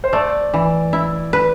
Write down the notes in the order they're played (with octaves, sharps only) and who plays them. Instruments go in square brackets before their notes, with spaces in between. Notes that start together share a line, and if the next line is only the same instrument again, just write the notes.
[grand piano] C5
[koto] A3 [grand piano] D5
[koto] E3
E4
B4